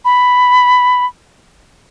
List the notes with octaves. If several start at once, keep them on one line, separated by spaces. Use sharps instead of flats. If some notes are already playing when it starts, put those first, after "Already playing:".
B5